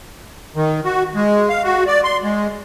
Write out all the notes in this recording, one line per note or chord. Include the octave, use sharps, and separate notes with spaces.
D#3
F#4
G#3
F5
F#4
D5
C6
G#3